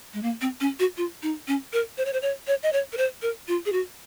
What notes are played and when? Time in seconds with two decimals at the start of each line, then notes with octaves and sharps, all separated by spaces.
0.13 G#3
0.23 A#3
0.41 C4
0.60 C#4
0.79 F#4
0.97 F4
1.23 D#4
1.48 C#4
1.73 A#4
1.98 C5
2.05 C#5
2.13 C5
2.22 C#5
2.47 C#5
2.63 D#5
2.73 C#5
2.93 A#4
2.97 C5
3.22 A#4
3.48 F4
3.66 G#4
3.72 F#4